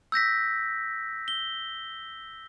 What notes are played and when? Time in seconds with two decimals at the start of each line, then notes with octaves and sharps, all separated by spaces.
0.12 E6 G6 A#6 B6
1.28 G7